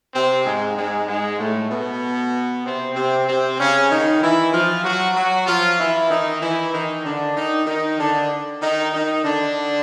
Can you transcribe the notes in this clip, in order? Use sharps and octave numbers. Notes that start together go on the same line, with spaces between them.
C3 C4
G#2 G#3
G#2 G#3
G#2 G#3
A2 A3
B2 B3
C3 C4
C3 C4
C3 C4
C#3 C#4
D#3 D#4
E3 E4
F3 F4
F#3 F#4
F#3 F#4
F3 F4
E3 E4
D#3 D#4
E3 E4
D#3 D#4
D3 D4
D#3 D#4
D#3 D#4
D3 D4
D#3 D#4
D#3 D#4
D3 D4